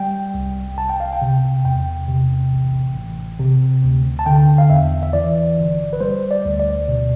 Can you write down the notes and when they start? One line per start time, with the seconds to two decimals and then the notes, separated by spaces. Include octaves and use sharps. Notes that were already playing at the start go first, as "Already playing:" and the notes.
Already playing: G3 G5
0.34 C2
0.78 C2 A5
0.89 G5
1.00 F5
1.13 G5
1.22 C3
1.65 E2 G5
2.08 C3
2.52 A1
2.95 A1
3.40 C3
3.83 D2
4.19 A5
4.26 D3 G5
4.58 F5
4.70 E2 E5
5.03 E5
5.13 E3 D5
5.58 G1
5.93 B4
6.00 G3 C5
6.31 D5
6.45 D2
6.59 D5
6.88 B2